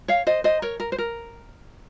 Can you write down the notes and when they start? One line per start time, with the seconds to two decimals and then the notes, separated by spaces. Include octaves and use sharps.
0.08 C#5 F5
0.27 C5 D#5
0.44 C5 D#5
0.62 A#4 C#5
0.80 A#4
0.92 C5
0.98 A#4